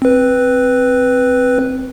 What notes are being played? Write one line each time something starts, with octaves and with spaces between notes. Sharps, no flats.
C4 B4